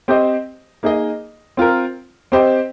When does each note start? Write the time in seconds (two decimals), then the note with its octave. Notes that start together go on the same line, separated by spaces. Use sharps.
0.08 C4 G4 C5 D#5
0.83 A#3 D#4 G#4 D#5
1.57 C4 F4 A#4
2.32 C4 G4 C5 D#5